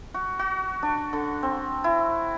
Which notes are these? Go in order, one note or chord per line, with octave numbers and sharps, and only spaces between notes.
F#4
F#4
D4
D3
C4
E4